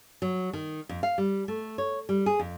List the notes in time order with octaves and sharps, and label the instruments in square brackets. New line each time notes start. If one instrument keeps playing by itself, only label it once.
[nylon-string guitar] F#3
D#3
F2
F5
G3
A3
C#5
G3
G#4
F2